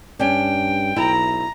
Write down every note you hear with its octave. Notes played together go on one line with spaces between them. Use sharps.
G2 C#4 D4 G5
B1 E4 A#5